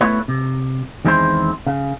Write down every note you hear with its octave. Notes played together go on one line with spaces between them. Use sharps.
A3 B3 E4 B4 C#5
C3
E2 D#3 G#3 C4 E4 C5
C#3